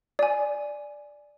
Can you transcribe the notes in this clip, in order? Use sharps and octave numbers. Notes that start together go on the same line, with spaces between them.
D5 G#5